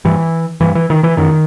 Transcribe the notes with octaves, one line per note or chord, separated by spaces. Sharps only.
G2 E3
G2 E3
E3
D#3
E3
F#2 D#3